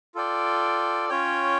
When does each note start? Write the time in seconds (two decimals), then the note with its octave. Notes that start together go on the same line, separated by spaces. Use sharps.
0.15 F4 A4 D5 G5
1.09 C#4 F4 C#5 G5